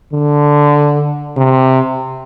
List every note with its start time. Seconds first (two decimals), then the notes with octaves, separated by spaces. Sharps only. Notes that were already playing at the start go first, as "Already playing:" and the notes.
0.13 D3
1.37 C3